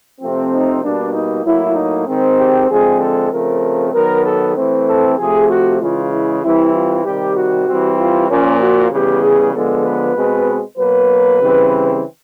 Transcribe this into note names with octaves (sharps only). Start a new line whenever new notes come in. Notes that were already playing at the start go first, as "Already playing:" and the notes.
C3 F3 A3 C4
D#4
B2 G3 A#3 D4
D#4
A2 F#3 A#3 E4
D#4
D#3 G#3 C4
G4
D3 F3 G#3 C4 G#4
A4
C#3 F3 A3 C4 A#4
D#3 F#3 B3 A#4
A4
E3 A3 C4
A4
C3 F3 A3 G#4
F#4
C#3 E3 G#3 F4
E4
E3 G3 C4 E4
F4
C3 D#3 G3 G4
F#4
E3 G3 C4
F4
A#2 F3 A#3 C#4
F#4
C#3 E3 G3 B3 G4
G#4
D3 F3 G#3 B3 A4
B4
B2 G#3 C4
B2 F#3 A#3 B4
C#3 E3 G3 C4